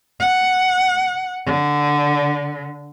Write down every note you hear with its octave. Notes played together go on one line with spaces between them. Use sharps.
F#5
D3